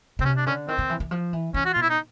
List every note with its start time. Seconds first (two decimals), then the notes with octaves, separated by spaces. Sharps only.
0.19 C#3 C4
0.25 C3 C#4
0.37 D4
0.46 D3 C#4
0.68 D#3 C4
0.78 D#3
0.90 E3
1.00 E3
1.11 F3
1.33 E3
1.54 E3 C#4
1.65 F#4
1.73 B2 F4
1.82 E4
1.90 D#4